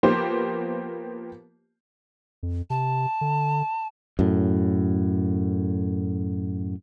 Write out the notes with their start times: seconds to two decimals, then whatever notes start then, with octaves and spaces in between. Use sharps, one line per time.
0.03 F3 A#3 B3 G4 C5
2.43 F2
2.70 C3 A5
3.21 D3
4.19 F#2 A2